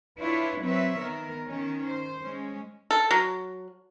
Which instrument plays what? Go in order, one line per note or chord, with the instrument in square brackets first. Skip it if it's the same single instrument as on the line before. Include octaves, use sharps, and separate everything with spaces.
[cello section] D4 E4 F4 B4 C#5
F#3 C4 B4 C#5 E5
D#3 B3 A#4
D#3 C#4
C5
G#3 C#4
[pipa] A4
F#3